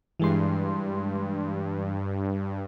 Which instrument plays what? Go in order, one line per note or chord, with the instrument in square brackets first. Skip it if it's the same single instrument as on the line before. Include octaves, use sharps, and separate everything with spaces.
[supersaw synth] G2 [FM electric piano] E3 G#3 C6